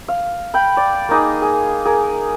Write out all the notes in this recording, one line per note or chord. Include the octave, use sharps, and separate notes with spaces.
F5
G5 B5
D5
A#3 D#4 G#4
G#4
G#4 A#4